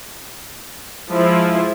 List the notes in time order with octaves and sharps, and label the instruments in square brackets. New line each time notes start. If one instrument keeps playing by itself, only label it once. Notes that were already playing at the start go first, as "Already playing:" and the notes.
[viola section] F3 G#3 E4